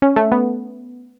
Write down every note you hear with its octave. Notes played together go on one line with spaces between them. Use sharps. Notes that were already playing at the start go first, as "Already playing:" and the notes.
C#4
A3
B3